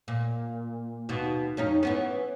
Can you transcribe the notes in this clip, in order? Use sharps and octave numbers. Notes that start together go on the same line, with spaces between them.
A#2
D#2 B2
F2 C#4 D#4
E3 B3 C#4